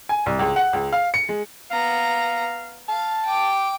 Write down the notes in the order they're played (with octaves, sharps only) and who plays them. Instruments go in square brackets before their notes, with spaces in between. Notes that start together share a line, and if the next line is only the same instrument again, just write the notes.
[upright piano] G#5
C2
C#2
F#5
C#2
F5
C#7
G#3
[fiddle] B3 A#5 [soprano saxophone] F5
[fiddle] F5 [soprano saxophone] A5
[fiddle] G5 D6